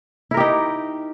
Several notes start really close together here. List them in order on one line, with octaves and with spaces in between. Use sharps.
E4 A#4 G4 D#4